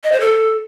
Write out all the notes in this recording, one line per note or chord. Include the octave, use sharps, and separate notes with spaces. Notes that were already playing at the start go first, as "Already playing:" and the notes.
D#5
C5
A4